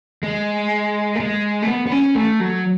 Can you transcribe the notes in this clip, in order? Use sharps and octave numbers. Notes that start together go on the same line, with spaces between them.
G#3
A3
G#3
A3
B3
B3
C#4
A3
F#3